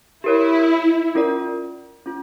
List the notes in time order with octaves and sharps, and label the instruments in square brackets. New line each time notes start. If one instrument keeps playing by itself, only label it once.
[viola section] E4 [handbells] G4 A#4 C#5
[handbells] C#4 F4 A#4 D5
C#4 F4